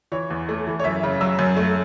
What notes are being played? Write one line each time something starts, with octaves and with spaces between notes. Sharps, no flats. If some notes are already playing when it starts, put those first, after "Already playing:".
E3 C#5
E2
A3
E3
C#5
F#2 E5
C#3
F#3 E6
F#2
A3